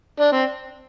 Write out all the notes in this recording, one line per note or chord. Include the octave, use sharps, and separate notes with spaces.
D4
C4